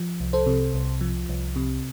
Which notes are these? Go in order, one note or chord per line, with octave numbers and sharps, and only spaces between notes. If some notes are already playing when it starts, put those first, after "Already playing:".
Already playing: F3
C2
A4 C5
C3
C2
F3
C2
C3